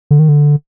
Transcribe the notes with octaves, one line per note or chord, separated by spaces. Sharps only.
D3
D#3
D3